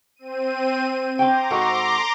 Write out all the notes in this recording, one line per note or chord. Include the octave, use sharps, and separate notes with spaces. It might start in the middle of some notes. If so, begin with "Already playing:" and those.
C4 D#7
C4 G5 A#5 C6 D6
G#2 F#4 A4